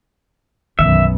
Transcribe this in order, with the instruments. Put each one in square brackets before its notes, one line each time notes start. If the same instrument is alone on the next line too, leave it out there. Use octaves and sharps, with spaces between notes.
[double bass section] B1 F#2 B3 [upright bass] D#3 E3 [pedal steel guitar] E5